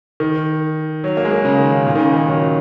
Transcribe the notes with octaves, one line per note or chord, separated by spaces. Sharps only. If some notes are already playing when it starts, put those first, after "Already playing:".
D#3
F#3
A#3
G#3
A#3
C#3
D#3
C#3
A#2
D#3
C#3
D#3
F#3